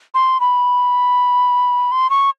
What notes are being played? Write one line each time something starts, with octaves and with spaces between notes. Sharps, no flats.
C6
B5
C6
C#6